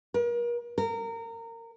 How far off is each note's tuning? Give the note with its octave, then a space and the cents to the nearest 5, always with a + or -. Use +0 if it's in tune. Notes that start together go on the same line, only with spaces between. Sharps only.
A#4 +40
A#4 -25